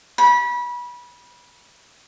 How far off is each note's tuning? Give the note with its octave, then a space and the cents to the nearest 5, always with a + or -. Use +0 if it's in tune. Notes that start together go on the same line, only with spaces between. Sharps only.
B5 -25